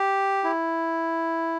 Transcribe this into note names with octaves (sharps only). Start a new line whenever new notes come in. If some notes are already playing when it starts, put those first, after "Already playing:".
Already playing: G4
E4